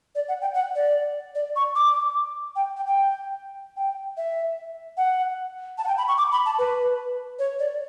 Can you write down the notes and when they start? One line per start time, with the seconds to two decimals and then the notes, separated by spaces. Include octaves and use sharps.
0.15 D5
0.28 F#5
0.41 G5
0.54 F#5
0.75 D5
1.35 D5
1.56 C#6
1.75 D6
2.56 G5
2.76 G5
2.87 G5
3.77 G5
4.17 E5
4.97 F#5
5.78 A5
5.84 F#5
5.88 G5
5.98 B5
6.08 C#6
6.18 D6
6.32 B5
6.46 A5
6.58 B4
7.39 C#5
7.59 D5